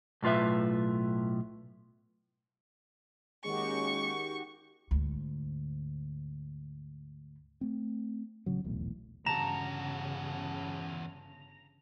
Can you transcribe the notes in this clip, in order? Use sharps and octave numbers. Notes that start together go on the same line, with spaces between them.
B1 A2 F4 B4 E5
D#3 G#3 A#3 C#4 F#4 G4 C#6
D2 G#2
A3 C4
A1 C#3 F#3
D#1 B1 E2 A2
G1 E2 C#3 F#4 A5 A#5 E7